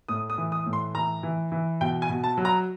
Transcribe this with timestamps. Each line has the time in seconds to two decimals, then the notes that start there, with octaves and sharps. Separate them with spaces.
0.09 A2 D#6
0.30 D#6
0.38 E3
0.52 D#6
0.66 A2
0.73 C6
0.95 E3 A#5
1.23 E3
1.52 E3
1.81 B2 G5
2.02 G#5
2.09 B2
2.24 A5
2.37 F#3
2.45 A#5